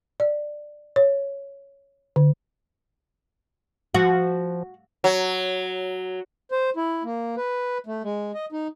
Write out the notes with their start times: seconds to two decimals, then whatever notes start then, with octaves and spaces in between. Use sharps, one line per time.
0.20 D5
0.96 C#5
2.16 D3
3.94 F3 F#4
5.04 F#3
6.51 C5
6.76 E4
7.04 A#3
7.37 B4
7.86 A3
8.04 G#3
8.34 D#5
8.52 D#4